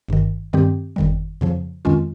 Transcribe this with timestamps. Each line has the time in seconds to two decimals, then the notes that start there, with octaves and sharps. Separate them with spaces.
0.08 G1 G2 D#3
0.53 G2 D#3 G3 C4 G4
0.96 G1 F2 D#3 G3
1.41 F2 C#3 F3
1.85 F2 D#3 G#3 C#4 F4